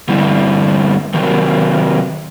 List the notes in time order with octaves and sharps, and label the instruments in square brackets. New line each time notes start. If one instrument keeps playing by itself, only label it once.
[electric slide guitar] G2 D3 G3 C4 E4
C3 D#3 F#3